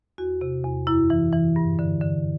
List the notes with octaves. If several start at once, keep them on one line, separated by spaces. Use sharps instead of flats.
E2 F#4
C3
E2
F#2 E4
E3
E3
G2
D3
D3